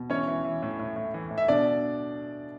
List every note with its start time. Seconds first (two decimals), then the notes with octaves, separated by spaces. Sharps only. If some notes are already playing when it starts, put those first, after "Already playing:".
Already playing: B2
0.10 E3 C#4 C#5
0.28 E3
0.44 E3
0.62 A2
0.79 A2
0.96 A2
1.14 E3
1.31 A2
1.38 E5
1.48 B2 D4 D5